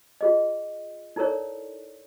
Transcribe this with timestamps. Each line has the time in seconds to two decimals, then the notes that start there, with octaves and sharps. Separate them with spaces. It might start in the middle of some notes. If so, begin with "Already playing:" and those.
0.21 F4 G#4 D#5
1.16 D#4 E4 A4 A#4 C#5 D5